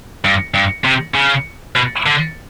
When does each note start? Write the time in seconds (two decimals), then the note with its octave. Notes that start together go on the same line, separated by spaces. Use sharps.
0.24 G2
0.54 G2
0.85 C3
1.15 C#3
1.76 B2
2.06 D3